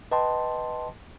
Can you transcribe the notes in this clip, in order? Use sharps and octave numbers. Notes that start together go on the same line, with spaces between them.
B4 D#5 G5 A5 C6